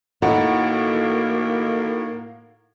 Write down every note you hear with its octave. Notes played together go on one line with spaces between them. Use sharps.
A2 A#3 D#4 E4 F#4